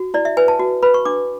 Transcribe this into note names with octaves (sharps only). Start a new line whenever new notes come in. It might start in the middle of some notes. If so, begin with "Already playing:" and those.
Already playing: F#4
E4 D5
E5
B4 G#5
A5
F#4
B4 B5
C#6
D4 D6